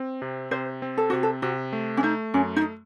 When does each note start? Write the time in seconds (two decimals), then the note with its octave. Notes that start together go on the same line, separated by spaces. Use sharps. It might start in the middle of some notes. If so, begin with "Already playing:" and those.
Already playing: C4
0.22 C3
0.51 C3 C5
0.82 C4
0.98 A4
1.10 C3 F#4
1.23 A4
1.42 C3 F#4
1.73 A3
1.97 C#4
2.03 A3 D#4
2.34 F#2 C#4
2.56 D#4